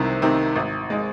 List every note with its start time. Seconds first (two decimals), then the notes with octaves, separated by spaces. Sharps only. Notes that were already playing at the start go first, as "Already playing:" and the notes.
Already playing: C2 C3 D#3 C4
0.22 C3 D#3 C4
0.56 G#1
0.90 G#3 D#4